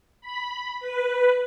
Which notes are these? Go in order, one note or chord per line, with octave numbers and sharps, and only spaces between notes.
B5
B4